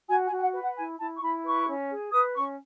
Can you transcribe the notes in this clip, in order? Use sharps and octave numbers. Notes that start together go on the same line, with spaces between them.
F#4 G#5
G#5
F#4
G#5
F#5
B4
F#5
E4 G#5
E4 A5
C#6
E4 B5
B4 C#6
C#4
G#4
B4 D#6
C#4 C#6